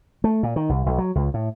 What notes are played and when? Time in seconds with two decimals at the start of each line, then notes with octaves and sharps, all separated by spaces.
0.24 A3
0.43 A#2
0.56 D#3
0.69 C2
0.86 B1
0.98 F#3
1.15 C#2
1.34 A2